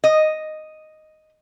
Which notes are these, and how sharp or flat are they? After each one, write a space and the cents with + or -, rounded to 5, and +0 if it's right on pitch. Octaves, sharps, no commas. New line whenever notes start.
D#5 +0